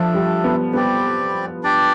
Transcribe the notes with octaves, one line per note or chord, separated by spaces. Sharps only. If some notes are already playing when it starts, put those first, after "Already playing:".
Already playing: F3 A3 D4 A4
G3
B3
G3 B3 C4 G4 D5
D4 G4 D5